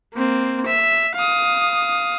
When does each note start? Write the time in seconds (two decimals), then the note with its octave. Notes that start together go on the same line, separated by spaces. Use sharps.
0.14 A#3 C4
0.67 E5
1.16 F5 D#6